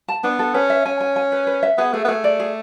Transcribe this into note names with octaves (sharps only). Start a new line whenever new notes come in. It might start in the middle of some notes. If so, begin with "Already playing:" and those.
A5
B3 D4
A4
C#4 B4
E5
C#4 G#5
G#5
G#5
B4
B4
E5
B3 G#4
A3 G#4
B3
A3 G#4
D5
G#4